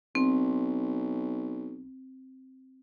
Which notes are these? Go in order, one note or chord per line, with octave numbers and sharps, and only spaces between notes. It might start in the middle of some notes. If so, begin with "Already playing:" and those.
B1 C4